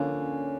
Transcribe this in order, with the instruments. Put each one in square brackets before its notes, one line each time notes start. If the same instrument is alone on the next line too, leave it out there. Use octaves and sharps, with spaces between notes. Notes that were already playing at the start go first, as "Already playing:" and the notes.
Already playing: [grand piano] D3 [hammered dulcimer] F3 A#3 C#4